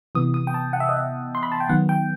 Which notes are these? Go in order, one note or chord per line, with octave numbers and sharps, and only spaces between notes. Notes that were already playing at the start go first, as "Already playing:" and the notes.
C3 E3 B3 D#6
D#6
G5
A5
F#5
E5
D#5
E5
C6
B5
A5
G5
D#3 F#3 B3 F#5
G5